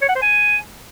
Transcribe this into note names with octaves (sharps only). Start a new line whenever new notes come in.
C#5
F#5
C5
G#5